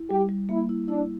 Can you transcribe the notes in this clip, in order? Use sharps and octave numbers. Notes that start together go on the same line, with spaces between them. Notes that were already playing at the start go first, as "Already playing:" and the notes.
Already playing: E4
G3 G4
G3
A#3 E4
E4
D4 E4